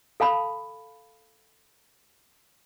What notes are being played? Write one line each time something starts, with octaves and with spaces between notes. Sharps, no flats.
A4 F5 A5 B5